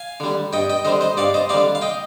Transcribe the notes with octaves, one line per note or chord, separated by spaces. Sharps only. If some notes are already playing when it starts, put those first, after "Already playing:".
Already playing: F5 G#5
D3 G3
G2 D#5 G5
D#5 G5
D3 G3 C5 D#5
C5 D#5
G2 D5 F5
C5 D#5
D3 G3 D5 F5
F5
D#5 G5